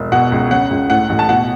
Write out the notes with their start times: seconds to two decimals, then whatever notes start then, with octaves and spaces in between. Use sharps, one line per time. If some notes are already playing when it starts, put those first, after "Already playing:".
Already playing: E1
0.12 B2 F#5
0.32 C#2
0.51 C#3 F#5
0.71 C#2
0.90 A2 F#5
1.09 A1
1.19 A5
1.29 B2 F#5